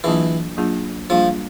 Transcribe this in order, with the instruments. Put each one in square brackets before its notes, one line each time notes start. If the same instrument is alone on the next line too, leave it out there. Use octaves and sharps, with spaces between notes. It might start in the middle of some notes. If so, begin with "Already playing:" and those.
[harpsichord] E3 [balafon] F#3 A#3 D4 F4 G#4
[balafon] F#3 A#3 D4 F4 G#4
[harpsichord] F3 [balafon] G3 A#3 D4 F4 G#4